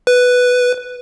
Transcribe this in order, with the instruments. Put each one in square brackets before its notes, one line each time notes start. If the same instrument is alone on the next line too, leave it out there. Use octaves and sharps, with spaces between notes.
[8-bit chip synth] B4